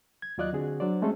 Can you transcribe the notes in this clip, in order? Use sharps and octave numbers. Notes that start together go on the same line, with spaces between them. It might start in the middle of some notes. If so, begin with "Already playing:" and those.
G#6
D#2 F#3 F4 D5 D#5 F#6
D3 C4 F#4 G#4
F#3 D4 C5 D5
G#3 A3 C4 C#4 G#4 A4